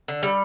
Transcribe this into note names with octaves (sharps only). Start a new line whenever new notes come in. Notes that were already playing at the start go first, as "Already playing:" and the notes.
D3
G3